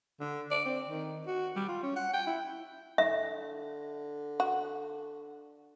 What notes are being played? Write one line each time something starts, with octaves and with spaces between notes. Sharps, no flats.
D3
D5
C4
D#3
F#4
G3
F4
C#4
F#5
G5
E4
D3 E5
F#4